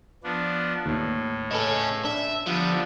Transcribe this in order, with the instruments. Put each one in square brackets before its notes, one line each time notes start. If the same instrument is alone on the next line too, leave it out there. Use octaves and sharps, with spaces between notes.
[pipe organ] F3 B3 D4
[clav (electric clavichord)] D#2 [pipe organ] A2
[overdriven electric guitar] C#3 C#4 [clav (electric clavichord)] A4 B4 D#5
[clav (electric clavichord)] D4 [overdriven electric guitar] E5
[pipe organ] D3 G3 B3 [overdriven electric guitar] F3